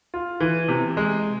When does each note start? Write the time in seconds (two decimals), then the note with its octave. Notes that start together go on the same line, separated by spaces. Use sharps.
0.14 F4
0.40 E3
0.68 C3
0.97 G#3